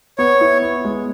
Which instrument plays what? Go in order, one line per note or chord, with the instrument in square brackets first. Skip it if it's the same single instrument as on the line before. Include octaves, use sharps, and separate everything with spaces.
[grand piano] B3 [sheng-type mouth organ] C#5
[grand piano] E4
B3
G#3